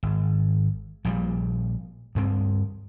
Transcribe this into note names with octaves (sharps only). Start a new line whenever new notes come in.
G#1
A#1 A#2 F3 G3
D2 G2 C4